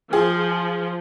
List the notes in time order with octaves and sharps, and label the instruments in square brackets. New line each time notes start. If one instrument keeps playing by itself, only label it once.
[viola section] F3 [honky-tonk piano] G#4